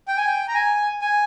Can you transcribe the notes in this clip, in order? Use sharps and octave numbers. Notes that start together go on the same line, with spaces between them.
G5
G#5
G5
A#5
G#5
G#5